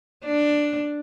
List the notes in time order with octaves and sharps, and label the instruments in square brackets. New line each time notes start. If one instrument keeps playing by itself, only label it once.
[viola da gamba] D4